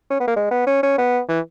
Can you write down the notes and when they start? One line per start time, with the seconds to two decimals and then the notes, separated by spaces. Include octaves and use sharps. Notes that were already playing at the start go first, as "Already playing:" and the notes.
0.10 C#4
0.20 B3
0.28 A#3
0.36 G#3
0.51 B3
0.67 C#4
0.83 C#4
0.98 B3
1.29 E3